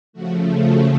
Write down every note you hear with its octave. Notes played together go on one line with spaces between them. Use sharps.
C#3 F3 A3 F#4
F#4